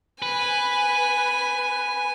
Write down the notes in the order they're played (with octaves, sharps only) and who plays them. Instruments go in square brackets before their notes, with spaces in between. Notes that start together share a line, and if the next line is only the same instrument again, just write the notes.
[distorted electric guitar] B4 [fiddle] G#5